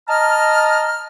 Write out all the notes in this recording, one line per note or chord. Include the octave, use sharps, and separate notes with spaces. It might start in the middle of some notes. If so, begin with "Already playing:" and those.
D#5 A5 A#5 F6